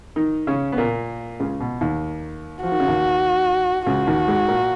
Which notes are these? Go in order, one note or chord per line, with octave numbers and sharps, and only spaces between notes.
D#3 D#4
C#3 C#4
B3
A#2 A#3
C#2 C#3
B2
D#2 D#3
F3 F#4
D#3
C#3
D#2 D#3
C#2 C#3 F#4
D#2 D#3
G#2 G#3
A#2 A#3